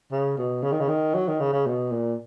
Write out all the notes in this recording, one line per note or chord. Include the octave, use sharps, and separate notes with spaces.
C#3
B2
C#3
D#3
C#3
D#3
F#3
D#3
C#3
C#3
B2
A#2